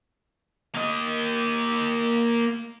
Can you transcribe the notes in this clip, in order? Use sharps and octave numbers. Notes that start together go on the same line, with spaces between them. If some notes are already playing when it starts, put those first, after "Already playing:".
A#3 D#5